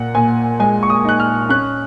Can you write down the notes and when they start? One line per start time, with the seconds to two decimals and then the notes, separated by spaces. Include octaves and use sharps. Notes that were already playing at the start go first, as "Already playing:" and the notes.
Already playing: A#2 F#5
0.15 A#2 G#5
0.60 G#3 G#5
0.83 C#6
0.90 D#6
1.05 D#4 F#6
1.20 F6
1.49 C#4 F#6